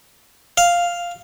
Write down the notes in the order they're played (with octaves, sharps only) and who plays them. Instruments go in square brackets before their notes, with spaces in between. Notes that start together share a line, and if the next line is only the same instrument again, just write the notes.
[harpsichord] F5